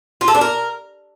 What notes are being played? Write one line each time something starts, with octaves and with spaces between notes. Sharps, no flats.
F4
A4
D4
A#4